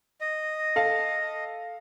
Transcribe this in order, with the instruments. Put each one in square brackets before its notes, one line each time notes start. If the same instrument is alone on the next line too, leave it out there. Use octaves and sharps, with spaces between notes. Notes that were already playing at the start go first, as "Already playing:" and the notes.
[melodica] D#5
[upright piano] A4 F5 A5